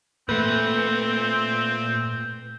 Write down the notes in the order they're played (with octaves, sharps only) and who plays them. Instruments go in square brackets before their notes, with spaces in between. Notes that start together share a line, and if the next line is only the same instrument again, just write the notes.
[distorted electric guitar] A#2 [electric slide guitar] A3 B4 [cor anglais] C4 [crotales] G6